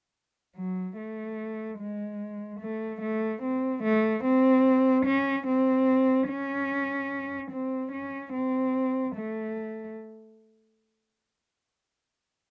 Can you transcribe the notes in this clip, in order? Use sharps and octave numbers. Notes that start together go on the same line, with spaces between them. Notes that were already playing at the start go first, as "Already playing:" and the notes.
F#3
A3
G#3
A3
A3
C4
A3
C4
C#4
C4
C#4
C4
C#4
C4
A3